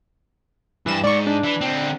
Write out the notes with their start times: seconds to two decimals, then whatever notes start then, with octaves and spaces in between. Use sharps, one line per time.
0.86 G2 E3 E7
1.04 G#2 D5 C#6
1.27 D4
1.43 E3
1.61 D3 C4